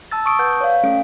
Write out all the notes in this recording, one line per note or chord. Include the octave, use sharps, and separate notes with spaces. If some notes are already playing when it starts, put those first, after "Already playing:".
A5 E6 A6
A5 C#6 D#6 D7
B4 F#5 G6
C#5 D5 F5
A3 C#4 A4 D7